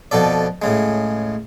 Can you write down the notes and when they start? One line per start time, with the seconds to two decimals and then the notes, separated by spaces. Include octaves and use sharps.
0.11 F2 B2 F3 A4 D5
0.62 A2 C#3 G#3